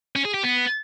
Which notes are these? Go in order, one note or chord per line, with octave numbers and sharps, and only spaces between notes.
C#4
G#4
G4
B3